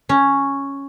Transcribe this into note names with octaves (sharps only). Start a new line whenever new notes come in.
C#4